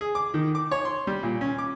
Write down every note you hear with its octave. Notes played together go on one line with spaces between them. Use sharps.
G#4
D6
D#3
D6
C#5
C6
G3
A#2
C#4
D6